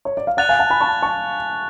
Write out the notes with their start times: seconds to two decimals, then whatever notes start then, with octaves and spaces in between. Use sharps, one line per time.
0.05 C#5
0.17 D5
0.27 F5
0.37 D5 F#5 F#6 A6 F7
0.49 F5 G#5
0.59 F#5 A5
0.70 G#5 B5
0.81 A5 C#6
1.02 A5 C#6